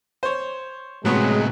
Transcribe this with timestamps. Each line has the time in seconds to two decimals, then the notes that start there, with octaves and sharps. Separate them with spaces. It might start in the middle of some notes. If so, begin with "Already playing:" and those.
0.23 C5 C#5
1.05 A2 C3 F#3 G#3 B3 G#4 C#5